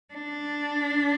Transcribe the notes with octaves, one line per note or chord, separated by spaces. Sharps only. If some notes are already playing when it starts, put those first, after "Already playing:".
D4